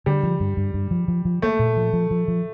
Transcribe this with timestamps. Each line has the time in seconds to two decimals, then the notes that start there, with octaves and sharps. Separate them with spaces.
0.06 D3 G3
0.23 F3
0.40 G2
0.57 G2
0.74 G2
0.91 F3
1.08 F3
1.25 F3
1.42 A3 A#3
1.59 A#2
1.77 F3
1.93 F3
2.11 F3
2.28 F3